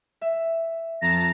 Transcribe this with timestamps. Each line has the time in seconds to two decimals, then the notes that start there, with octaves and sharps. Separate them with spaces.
0.21 E5
1.02 F2 A5 A#5 A#6